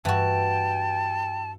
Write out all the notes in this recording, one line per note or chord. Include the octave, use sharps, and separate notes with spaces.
G2 E3 F#4 G5 A5